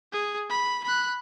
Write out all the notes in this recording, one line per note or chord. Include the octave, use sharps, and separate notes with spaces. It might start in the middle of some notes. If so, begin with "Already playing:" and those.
G#4
B5
B5 F#6